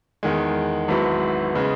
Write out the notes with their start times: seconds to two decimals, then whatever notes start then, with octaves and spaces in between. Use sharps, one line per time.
0.23 E2 D#3 G#3
0.88 G#1 G#2 F#3 B3 E4
1.55 C#3 G#3 B3